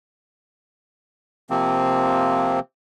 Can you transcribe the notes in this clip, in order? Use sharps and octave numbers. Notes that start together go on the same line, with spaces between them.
C3 F3 A#3 C4